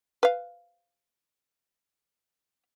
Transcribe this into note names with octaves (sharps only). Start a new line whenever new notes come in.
B4 F5